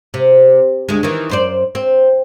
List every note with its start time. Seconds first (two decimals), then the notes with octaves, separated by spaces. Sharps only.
0.14 C3
0.89 D2 G#3
1.03 D#3 E3
1.30 F#2 C5 D5
1.75 C4